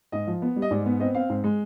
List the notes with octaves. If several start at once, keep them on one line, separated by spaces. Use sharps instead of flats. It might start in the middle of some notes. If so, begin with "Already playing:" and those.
G#2 D#5
F3
B3
G3
D#5
G#2 D5
B3
C4 D#5
C4 F5
G#2
G#3